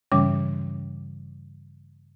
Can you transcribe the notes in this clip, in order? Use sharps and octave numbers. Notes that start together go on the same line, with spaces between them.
G2 C#3 E3 G3 C#4 D6